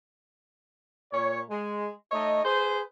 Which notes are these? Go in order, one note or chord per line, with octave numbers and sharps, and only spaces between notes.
A#2 C#5
G#3
A3 D#4 C#5 D#5
G#4 B4 C5